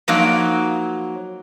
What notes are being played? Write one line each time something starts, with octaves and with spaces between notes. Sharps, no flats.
F3 F#3 A#3 D#4